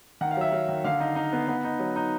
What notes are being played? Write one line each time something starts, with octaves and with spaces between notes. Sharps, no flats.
D#3 F#5
F5
F#3 E5
F#3 F5
D#3
D3 F5
D#4
D#4
B3
B3
D#4
F#3
D#4